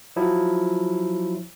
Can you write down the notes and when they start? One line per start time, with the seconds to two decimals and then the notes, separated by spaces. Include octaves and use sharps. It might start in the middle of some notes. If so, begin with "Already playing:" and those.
0.16 F3 F#3 E4